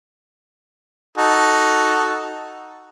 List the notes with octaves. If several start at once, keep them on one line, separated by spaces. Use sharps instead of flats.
D#4 F#4 A4